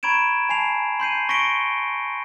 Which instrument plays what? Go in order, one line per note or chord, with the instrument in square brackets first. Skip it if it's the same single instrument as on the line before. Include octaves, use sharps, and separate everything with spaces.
[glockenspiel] A#5 B5 C#6 G#6 D7 E7
G#5 A5 C7 F7
C6 G6 C7 D#7
C#6 A#6 B6 C#7 D7 G7